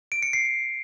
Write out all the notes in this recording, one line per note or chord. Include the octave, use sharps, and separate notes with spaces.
D7
C#7
C7